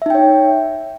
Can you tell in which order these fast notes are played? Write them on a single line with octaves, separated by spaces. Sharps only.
E5 D#4 G5 C#5